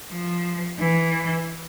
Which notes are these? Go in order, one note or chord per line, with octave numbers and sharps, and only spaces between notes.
F3
E3